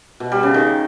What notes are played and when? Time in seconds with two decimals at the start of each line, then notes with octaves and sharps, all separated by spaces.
0.20 B2
0.32 G3
0.43 C#3
0.54 D#3